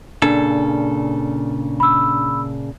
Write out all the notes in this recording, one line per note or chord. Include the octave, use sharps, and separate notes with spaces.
A#2 C#3 D4 A4
B5 E6